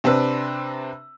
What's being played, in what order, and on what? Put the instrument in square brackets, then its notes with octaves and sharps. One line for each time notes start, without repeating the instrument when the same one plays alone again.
[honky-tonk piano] C3 C4 D4 B4 E6